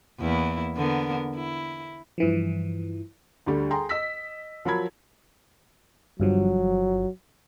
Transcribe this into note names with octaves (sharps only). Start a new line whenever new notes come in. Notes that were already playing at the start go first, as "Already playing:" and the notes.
E2 A#3 E4
D3 B3 A#4
E4
G2 E3 F3
D2 D3 G3
G#4 G5 A#5 C6
D#5 E6 B6
F3 F#3 A#4 B5 G#6
G1 G2 F3 F#3